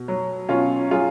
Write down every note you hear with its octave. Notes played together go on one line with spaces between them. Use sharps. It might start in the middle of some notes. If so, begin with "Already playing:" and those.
Already playing: B2
F#3
B2 C#4 F4
F#3 F4 G#4